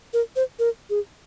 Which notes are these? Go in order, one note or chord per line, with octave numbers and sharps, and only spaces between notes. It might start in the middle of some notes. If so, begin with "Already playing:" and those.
A#4
C5
A#4
G#4